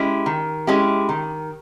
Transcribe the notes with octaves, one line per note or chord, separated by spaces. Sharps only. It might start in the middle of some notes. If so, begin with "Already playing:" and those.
Already playing: G#3 C#4 E4 G4
D#3
G#3 C#4 E4 G4
D#3